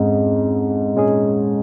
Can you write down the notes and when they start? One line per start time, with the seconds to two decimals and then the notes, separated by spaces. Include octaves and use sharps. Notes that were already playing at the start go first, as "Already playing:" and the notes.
Already playing: F2 G#2 G#3 C#4 G#4
0.95 A#2 G#3 C#4 G#4